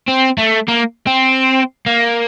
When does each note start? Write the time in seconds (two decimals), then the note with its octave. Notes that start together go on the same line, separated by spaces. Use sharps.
0.08 C4
0.38 A3
0.68 A#3
1.07 C4
1.86 A#3